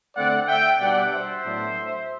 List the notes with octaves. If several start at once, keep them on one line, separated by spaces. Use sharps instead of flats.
D3 A3 C4 D5 F#5
E5 G5
B2 G3 D4 D5 F#5
C5 E5
A2 F#3 B3 D4